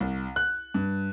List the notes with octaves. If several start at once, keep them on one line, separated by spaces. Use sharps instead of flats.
C2
F#6
G2